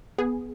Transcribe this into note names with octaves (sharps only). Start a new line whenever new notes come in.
B3 G#4